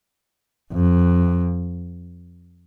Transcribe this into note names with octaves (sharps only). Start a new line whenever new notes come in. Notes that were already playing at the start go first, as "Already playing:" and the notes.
F2